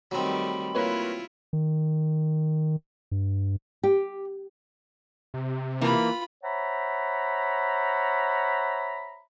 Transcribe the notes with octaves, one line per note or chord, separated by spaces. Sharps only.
D#3 F#3 G3 A3 C4 B5
A#3 E4 F4 B4 C#5
D#3
G2
G4
C3
E3 A#3 F4 B5
C5 C#5 E5 F#5 A#5 B5